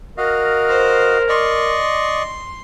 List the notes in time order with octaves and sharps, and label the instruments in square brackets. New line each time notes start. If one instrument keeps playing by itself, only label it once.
[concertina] F#4 D#5 F5 [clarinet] A#4
[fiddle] C5
[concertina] D5 D#5 C#6 [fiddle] C6